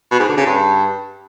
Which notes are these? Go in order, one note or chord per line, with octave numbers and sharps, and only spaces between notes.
B2
G#2
D3
C#3
G2